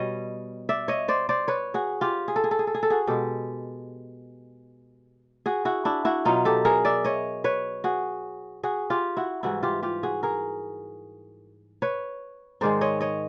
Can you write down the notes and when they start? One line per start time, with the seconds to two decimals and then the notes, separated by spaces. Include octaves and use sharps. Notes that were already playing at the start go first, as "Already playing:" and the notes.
Already playing: B2 G3 C#5 D#5
0.69 D5 E5
0.88 C#5 D#5
1.08 C5 D5
1.29 C5 D5
1.48 B4 C#5
1.74 F#4 G#4
2.01 F4 G4
2.28 G#4
2.36 A4
2.44 G#4
2.51 A4
2.59 G#4
2.67 A4
2.75 G#4
2.83 A4
2.90 F#4 G#4
3.07 B2 G#3 G4 A4
5.46 F#4 G#4
5.65 E4 F#4
5.85 D4 E4
6.05 E4 F#4
6.25 B2 F#3 D#4 F4
6.45 G4 A4
6.65 G#4 A#4
6.85 D5 E5
7.04 C#5 D#5
7.44 B4 C#5
7.84 F#4 G#4
8.63 F#4 G#4
8.90 F4 G4
9.17 E4 F#4
9.43 G#2 E3 G3 E4 F#4
9.63 F4 G4
9.83 F4 G4
10.03 F#4 G#4
10.23 G#4 A#4
11.82 B4 C#5
12.61 G#2 D#3 G#3 C5 D5
12.81 C#5 D#5
13.01 C#5 D#5